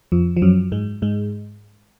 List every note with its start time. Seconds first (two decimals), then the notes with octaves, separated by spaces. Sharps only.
0.12 F2 F3
0.37 F3
0.42 F#2 F#3
0.72 G#2 G#3
1.02 G#2 G#3